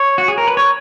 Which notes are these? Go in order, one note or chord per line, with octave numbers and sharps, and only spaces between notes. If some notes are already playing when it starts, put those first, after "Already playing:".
Already playing: C#5
F#4
G#4
A#4
B4
C#5